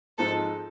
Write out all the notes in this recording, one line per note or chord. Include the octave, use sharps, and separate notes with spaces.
G#2 F3 G#3 C4 D#4 A4